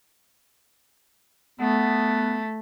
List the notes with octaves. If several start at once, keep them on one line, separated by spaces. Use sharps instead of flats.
A3 B3